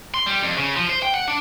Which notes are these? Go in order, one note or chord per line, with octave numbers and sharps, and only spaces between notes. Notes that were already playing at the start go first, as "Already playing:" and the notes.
C6
G3
F2
C#3
F3
C5
G5
F#5
D4